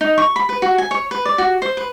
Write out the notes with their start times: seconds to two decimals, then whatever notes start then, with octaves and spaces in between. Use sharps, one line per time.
0.01 D#4
0.18 C#6
0.36 B5
0.49 B4
0.62 F#4
0.78 G#5
0.91 C#5
1.11 B4
1.25 D5
1.38 F#4
1.62 C5
1.77 B4